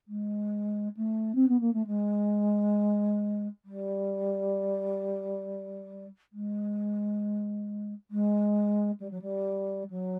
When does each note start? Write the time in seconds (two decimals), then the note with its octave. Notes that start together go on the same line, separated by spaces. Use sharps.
0.08 G#3
0.96 A3
1.35 C4
1.48 B3
1.60 A#3
1.73 A3
1.86 G#3
3.65 G3
6.33 G#3
8.11 G#3
9.00 G3
9.10 F#3
9.21 G3
9.90 F#3